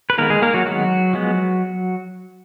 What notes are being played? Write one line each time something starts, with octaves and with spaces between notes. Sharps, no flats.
B4
D#3 G#3 A#3 B3 A#4
G#3 G#4
A#3 A#4
F#3 F#4
D#3 F#3 G#3 B3 F#4
F3 G#3 B3